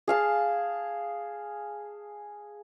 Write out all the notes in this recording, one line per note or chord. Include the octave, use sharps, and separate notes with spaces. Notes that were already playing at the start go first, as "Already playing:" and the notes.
G#4 F5 A5